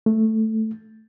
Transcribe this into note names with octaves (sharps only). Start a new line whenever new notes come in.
A3